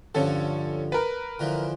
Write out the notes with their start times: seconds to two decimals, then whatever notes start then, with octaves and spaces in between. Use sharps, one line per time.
0.15 G2 D3 F3 C#4 A4
0.92 A#4 B4
1.39 D3 E3 F3